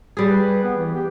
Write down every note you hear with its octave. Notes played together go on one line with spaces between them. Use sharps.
G3 G#4
B4
B3
E3
G4